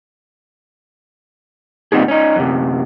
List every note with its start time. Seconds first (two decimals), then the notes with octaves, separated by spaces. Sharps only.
1.92 A#2 G3 B3 C4 D#4 G#4
2.08 C#4 D#4
2.36 F#2 C3